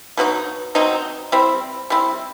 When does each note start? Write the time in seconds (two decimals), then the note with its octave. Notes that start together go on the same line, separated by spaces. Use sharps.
0.17 B2 F#3 C4 D#4
0.75 B2 F#3 C4 D#4
1.32 G3 C4 E4
1.90 G3 C4 E4